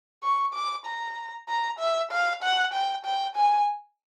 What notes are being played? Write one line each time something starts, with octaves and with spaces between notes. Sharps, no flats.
C#6
D6
A#5
A#5
E5
F5
F#5
G5
G5
G#5